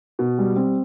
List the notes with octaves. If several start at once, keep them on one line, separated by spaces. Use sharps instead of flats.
B2
G3
C4